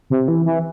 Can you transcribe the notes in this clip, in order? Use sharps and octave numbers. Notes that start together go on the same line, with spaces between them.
C3
E3
E3